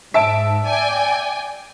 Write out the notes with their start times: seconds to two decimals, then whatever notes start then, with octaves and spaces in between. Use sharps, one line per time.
0.14 G#2 E5 A5 D7
0.66 D5 G5 G#5